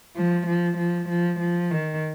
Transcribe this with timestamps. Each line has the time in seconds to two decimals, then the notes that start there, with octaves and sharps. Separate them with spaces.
0.16 F3
0.47 F3
0.78 F3
1.09 F3
1.40 F3
1.71 D#3